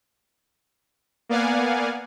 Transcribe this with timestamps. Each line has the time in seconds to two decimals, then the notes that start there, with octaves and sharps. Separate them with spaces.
1.29 A#3 B3 D5 F5 F#5 G#5